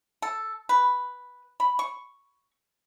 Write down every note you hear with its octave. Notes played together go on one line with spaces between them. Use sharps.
A4
B4
B5
C#6